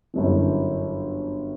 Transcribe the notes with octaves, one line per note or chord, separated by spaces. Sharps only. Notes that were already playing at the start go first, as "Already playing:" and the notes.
G1 F#2 E3